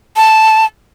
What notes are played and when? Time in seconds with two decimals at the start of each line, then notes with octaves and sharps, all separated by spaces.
0.17 A5